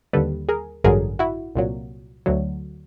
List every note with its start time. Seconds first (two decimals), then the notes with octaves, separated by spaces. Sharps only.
0.13 D#2 D3 G3 A4 B4
0.49 G#4 A#4
0.84 A1 G2 D3 F#3 G#4 A#4
1.19 E4 F#4
1.56 C2 A#2 F#3
2.26 D2 D3 F#3